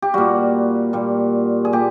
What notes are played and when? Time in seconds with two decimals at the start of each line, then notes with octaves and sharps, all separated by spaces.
0.02 G4
0.14 A#2 G3 F#4
0.93 A#2 G3
1.65 G#4
1.73 A#2 G4